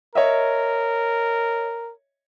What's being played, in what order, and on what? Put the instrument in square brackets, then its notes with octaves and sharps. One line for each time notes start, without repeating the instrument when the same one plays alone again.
[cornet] A#4 [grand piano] C#5 D#5 E5